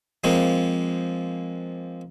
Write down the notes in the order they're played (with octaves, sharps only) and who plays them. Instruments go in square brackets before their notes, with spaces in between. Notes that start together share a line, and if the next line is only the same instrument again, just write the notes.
[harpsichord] F3 G#3 A#3 C4